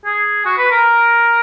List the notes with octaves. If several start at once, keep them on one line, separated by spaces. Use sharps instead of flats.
G#4
F#4
B4
A#4